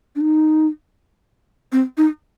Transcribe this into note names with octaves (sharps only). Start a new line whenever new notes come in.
D4
D#4
C4
D#4